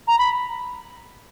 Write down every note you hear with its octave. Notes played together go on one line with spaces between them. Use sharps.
A#5
B5